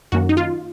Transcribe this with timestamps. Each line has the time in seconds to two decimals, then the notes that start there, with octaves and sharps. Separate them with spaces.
0.12 F#2 D#3 A#3 C#4 F#4
0.29 D#4
0.37 F4